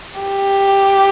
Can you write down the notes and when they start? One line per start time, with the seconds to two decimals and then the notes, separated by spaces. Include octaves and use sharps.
0.20 G4